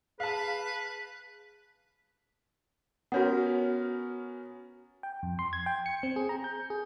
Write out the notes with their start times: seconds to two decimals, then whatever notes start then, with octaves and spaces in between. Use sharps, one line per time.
0.20 G#4 B4 F5 A5
3.12 B3 C#4 F#4 A#4 C#5 F#5
5.03 G5
5.23 F2
5.39 C6
5.53 G#6
5.66 G5
5.86 C#7
6.03 C4
6.16 G#4
6.29 A#5
6.44 G6
6.70 G#4